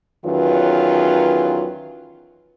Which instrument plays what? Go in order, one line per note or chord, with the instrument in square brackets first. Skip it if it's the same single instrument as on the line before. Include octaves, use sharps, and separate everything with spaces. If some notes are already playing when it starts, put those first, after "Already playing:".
[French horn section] E2 D#3 F#3 C#4 F4 B4